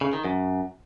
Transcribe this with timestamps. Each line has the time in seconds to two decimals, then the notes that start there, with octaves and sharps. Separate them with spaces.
0.01 C#3
0.13 D#3
0.25 F#2